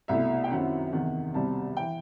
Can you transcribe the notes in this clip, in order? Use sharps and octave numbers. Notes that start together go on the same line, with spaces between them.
C2 B2 A3 E4 E5
G5
F#2 D#3 F#3 C4 E4 F#5
E2 C3 D#3 F#5
C2 B2 G3 C4 A5
E3 G5